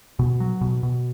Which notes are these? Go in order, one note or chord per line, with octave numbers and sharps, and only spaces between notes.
B2
F#3
B2
B2